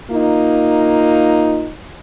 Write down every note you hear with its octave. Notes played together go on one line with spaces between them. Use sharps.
A#3 D#4 F4